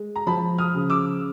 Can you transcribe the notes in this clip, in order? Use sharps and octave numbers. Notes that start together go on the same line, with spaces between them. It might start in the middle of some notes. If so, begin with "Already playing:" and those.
Already playing: G#3
A#5
F3 A5 B5
D#6 F6
C#3
D6 E6